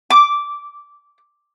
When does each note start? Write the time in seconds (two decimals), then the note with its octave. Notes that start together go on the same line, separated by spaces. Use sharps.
0.10 D6